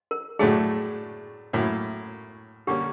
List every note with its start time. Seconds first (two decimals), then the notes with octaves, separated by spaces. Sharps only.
0.11 A#4
0.39 A2 F#3 A3 D4 G#4
1.53 A2 F#3 A#3 C#4 E4
2.67 D3 G3 A#3 C#4 G4